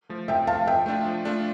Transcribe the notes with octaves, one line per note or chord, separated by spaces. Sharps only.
F3 A3
C3 E5 G5
F3 A3 F5 A5
F3 E5 G5
A3 D4 F4
F3
A3 D4 F4